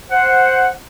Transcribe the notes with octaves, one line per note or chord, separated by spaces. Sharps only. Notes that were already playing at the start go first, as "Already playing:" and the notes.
C5 F#5